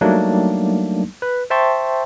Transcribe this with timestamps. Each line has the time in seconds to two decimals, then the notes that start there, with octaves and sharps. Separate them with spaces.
0.01 F#3 G3 A3 A#3 D4 D#4
1.22 B4
1.50 C5 E5 G5 A5 C6 C#6